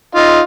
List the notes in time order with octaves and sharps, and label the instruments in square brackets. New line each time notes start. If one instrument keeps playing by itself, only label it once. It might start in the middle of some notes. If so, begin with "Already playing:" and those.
[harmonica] D#4 F4